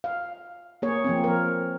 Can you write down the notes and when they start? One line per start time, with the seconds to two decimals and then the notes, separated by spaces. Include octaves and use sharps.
0.04 F5
0.82 A#3 G#4 C#5
1.04 F3 A#3 C4
1.24 F3 A#4